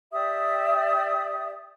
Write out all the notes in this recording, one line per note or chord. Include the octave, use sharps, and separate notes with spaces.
G4 D5 E5 D#6